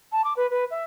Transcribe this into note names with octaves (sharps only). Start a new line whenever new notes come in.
A5
D6
B4
B4
E5